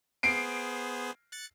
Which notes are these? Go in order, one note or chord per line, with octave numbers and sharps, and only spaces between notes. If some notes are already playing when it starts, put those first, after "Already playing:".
B3 G#4 C5 C7 D7
F#6 A6 C#7